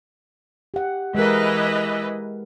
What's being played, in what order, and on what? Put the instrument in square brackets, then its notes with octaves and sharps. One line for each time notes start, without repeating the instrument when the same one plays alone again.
[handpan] G4 F#5
[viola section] E3 B4 D#5 [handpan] G#3 A#4